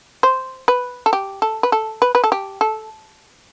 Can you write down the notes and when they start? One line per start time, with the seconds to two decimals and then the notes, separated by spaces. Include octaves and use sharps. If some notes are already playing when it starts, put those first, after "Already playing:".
0.23 C5
0.68 B4
1.06 A4
1.13 G4
1.42 A4
1.63 B4
1.72 A4
2.02 B4
2.15 B4
2.24 A4
2.32 G4
2.61 A4